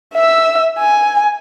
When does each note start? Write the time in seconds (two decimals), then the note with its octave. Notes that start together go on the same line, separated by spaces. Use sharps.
0.14 E5 E6
0.79 G#5